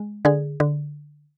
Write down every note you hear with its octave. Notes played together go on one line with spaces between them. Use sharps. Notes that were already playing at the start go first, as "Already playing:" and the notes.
Already playing: G#3
D3 G#4
D3